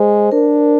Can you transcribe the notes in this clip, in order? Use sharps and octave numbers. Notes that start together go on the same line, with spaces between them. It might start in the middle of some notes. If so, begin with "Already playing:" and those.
Already playing: G#3 C5
D4 A#4